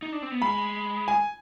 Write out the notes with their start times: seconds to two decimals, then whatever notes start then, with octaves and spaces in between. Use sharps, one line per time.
0.02 D#4
0.12 D4
0.22 C4
0.31 B3
0.42 G#3 B5
1.08 G#5